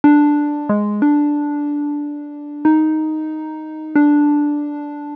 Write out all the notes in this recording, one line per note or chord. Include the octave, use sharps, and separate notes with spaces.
D4
G#3
D4
D#4
D4